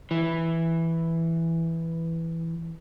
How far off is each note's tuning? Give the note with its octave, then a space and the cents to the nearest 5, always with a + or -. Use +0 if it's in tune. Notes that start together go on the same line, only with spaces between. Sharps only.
E3 +0